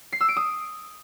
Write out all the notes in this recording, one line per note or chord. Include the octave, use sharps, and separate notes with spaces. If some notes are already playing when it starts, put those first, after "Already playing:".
C7
E6
D7
D#6